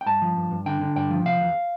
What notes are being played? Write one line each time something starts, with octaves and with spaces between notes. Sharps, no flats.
G5
G2 A5
F3
G2
G2
D3 G5
D3
G2 G5
F3
C3 F5
E2